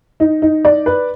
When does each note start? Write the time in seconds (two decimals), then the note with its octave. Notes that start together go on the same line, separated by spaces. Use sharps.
0.20 D#4
0.42 D#4
0.65 D5
0.86 B4